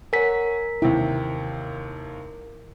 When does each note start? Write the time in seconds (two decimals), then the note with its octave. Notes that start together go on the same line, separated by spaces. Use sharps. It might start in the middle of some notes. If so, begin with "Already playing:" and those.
0.13 A#4 C#5 F#5 G#5 B6
0.82 D#2 C3 E4 G5